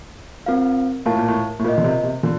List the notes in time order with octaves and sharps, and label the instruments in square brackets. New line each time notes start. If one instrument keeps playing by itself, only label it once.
[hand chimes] C4 F4 A#4 F5
[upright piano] A2 [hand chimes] F4 A#4 F5 A5
[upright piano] A#2
A2
A2
[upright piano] A#2 [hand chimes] F4 A#4 D#5
[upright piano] D3
C3
C3
[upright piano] D3 [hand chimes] F4